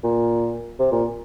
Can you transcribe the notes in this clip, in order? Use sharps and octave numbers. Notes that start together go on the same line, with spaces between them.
A#2
C3
A#2